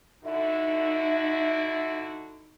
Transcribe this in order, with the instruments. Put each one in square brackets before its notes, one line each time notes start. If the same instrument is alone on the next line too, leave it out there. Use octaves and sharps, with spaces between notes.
[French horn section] D3 E4 F#4 [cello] D#4 [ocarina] E5